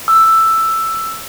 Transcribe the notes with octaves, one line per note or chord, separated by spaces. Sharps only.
E6